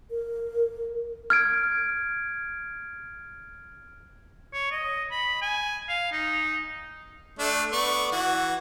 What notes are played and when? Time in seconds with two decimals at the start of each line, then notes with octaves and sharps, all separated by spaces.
0.11 A#4
1.30 F6 G#6 D7
4.53 C#5
4.71 D#5
5.11 B5
5.42 G#5
5.89 F5
6.12 D#4
7.39 A3 D4
7.72 B3 D5 C#6
8.12 E3 F#4